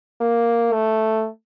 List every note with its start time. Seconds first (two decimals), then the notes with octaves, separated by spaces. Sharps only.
0.21 A#3
0.72 A3